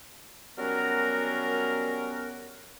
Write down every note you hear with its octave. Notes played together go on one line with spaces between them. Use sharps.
F#3 G3 B3 C#4 F#4 A#4